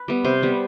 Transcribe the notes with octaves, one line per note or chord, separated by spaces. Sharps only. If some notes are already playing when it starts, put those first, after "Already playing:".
Already playing: B4
G3 B3
C3 C5
G3 B3